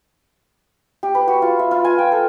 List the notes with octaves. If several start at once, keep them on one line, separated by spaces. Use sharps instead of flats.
G4
B4
F#4
F4
E5
F4
G#5
G5
A4